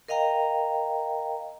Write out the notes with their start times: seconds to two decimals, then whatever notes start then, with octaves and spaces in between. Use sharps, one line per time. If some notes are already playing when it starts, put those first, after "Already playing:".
0.08 A#4 D#5 F5 G5 A#5